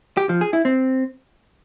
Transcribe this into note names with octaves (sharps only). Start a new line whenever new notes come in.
G4
F3
G#4
E4
C4